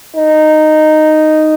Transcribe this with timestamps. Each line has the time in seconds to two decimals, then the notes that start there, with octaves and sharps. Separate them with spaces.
0.15 D#4